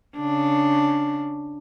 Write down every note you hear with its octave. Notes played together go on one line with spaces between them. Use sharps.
C#3 D4